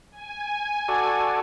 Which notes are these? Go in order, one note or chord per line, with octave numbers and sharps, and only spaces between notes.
G#5
F#4 A4 D5